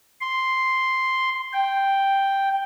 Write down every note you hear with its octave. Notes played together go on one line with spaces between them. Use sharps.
C6
G5